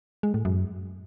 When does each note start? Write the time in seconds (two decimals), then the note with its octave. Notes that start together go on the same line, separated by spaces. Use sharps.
0.23 G#3
0.34 A2
0.45 F#2